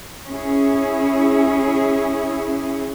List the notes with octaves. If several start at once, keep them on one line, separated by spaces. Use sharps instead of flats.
C#4 E4 G#4